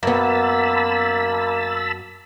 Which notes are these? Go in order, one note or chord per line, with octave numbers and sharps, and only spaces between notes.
F#2 A#3 B3 A5 B5 E6